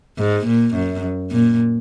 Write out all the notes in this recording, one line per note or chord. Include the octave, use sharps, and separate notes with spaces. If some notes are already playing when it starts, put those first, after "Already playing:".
G#2
A#2
F#2
A#2